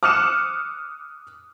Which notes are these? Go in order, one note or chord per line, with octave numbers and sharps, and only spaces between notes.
D6 D#6 F6 F#6 C#7 E7